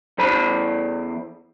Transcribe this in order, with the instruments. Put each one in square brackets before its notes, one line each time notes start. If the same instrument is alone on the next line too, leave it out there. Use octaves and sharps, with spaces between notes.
[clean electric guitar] E2 C5 B5